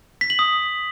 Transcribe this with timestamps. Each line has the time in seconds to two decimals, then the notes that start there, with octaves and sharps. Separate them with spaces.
0.21 B6
0.30 F#7
0.39 D#6